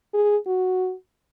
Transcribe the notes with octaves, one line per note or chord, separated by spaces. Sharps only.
G#4
F#4